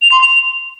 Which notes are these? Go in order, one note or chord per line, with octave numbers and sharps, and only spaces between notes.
F7
C6
F7